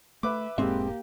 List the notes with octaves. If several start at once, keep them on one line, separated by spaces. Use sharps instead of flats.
A3 B4 E5 D6
E1 G#2 G#3 A#3 C4 G4 E5